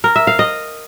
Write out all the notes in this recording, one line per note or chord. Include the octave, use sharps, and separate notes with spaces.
A#4
E5
F5
D#5